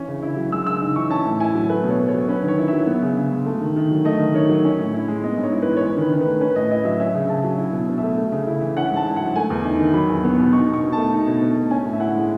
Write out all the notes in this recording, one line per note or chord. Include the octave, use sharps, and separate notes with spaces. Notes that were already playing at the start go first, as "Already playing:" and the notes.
Already playing: E3 C#4
C#3
E4
F#3
G#3 E6
C#3 E6
D#4
E3 C#6
C#4 A5
A2
E4 G#5
F#3
A3 B4
B2
C#5
B2
C#5
F#3
C#4 B4
D#3 C#5
E4
E5
F#3
B3
C#3
C#3
G#3
A3
D#3
D#3
F#3
A3 D#5
D#3
D#3 C#5
F#3
C#4
A2
E4
G#3
B3 D#5
G#2
C#5
E4
E3 B4
C#5
C#4 B4
D#3 B4
D#3
B4
A3
C#4 B4
A2 D#5
E4 D#5
F#3 E5
C#4 E5
C#3
C#3 A5
F#3
E4
B2
B2
E5
A3
A3
C#3
E4
E3
C#4 F#5
G#2 A5
E4
F#3 F#5
A3 G#5
E2
D#4
D#3
F#3 B5
E2
B3
B2
D#4 C#6
B2 C#6
B2
A5
A3
D#4
B2
B2
A3
C#4 G#5
A2
E5
E4 F#5
G#3